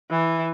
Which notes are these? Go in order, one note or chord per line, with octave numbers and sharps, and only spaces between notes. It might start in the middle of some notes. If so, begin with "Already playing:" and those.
E3